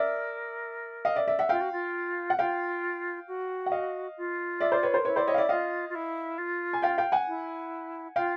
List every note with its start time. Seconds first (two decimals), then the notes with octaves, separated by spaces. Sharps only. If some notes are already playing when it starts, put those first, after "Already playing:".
Already playing: A#4 D5 E5
1.05 D#5 F5
1.16 D5 E5
1.28 D5 E5
1.39 E5 F#5
1.49 F4 F5 G5
1.60 F#4
1.72 F4
2.30 F#5
2.39 F4 F5 G5
3.27 F#4
3.66 F#5
3.72 D#5 F5
4.17 F4
4.60 D5 E5
4.72 C5 D5
4.83 B4 C#5
4.94 A#4 C5
5.05 E4 B4 C#5
5.16 C5 D5
5.27 C#5 D#5
5.34 F5
5.38 D5 E5
5.49 F4 D#5 F5
5.89 F4
5.95 E4
6.38 F4
6.73 G#5
6.82 F5 G5
6.98 F5 G5
7.12 F#5 G#5
7.27 E4
8.16 F4 F5 G5